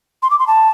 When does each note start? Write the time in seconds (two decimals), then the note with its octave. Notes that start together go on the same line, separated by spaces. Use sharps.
0.23 C6
0.30 D6
0.39 C6
0.47 A5